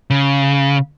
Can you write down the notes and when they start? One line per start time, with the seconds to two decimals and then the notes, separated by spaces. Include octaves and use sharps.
0.10 C#3